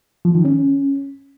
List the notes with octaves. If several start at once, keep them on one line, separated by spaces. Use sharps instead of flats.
F3
D#3
C#4